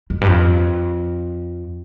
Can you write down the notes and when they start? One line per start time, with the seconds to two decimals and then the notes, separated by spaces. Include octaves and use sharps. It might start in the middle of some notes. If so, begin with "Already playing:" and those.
0.10 F2
0.21 G2
0.27 F2